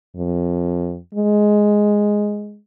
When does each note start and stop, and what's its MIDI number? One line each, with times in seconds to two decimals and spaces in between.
0.16 0.97 41
1.15 2.58 56